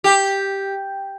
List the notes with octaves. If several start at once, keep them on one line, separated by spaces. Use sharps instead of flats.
G4